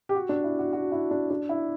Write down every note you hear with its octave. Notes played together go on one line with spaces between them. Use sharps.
G4
F#4
D4
E4
F#4
F#4
E4
D4
D4
E4